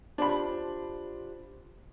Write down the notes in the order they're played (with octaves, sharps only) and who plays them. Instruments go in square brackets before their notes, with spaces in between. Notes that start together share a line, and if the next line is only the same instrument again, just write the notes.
[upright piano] D4 B5 [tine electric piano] F4 G4 C5